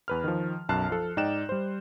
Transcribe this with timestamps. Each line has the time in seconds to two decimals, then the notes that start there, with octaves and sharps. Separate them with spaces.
0.08 E2 B4 F6
0.24 D#3 F3
0.69 B1 F#2 A5 F6 F#6 C7
0.89 F3 A4
1.17 G#2 D#4 D5 G5 F#6 E7
1.49 G3 C5